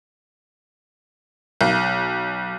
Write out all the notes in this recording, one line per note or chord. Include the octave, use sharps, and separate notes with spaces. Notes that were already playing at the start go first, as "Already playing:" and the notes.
B1